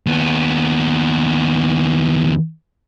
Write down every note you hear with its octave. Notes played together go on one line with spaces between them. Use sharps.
D#2 B3